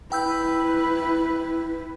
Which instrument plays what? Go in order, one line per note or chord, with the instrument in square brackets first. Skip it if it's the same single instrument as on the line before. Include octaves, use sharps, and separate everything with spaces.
[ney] E4 [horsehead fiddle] B4 [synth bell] G5 E6 G6